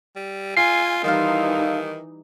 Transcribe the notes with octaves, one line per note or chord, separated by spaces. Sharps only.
G3
F4 G#5 C7
D#3 E3 G3 D#4 F4 A4 F5